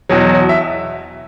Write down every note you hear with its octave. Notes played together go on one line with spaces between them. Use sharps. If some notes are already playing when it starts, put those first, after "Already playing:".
E2 B2 F#3
E5